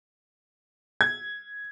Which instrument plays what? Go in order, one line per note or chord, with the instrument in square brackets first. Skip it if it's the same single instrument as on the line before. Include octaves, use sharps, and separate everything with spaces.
[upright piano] G#6